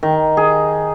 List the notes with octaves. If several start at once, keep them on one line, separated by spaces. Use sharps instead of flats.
D#3
G#4